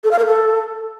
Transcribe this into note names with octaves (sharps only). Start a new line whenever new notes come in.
A4
F5
A#4
A4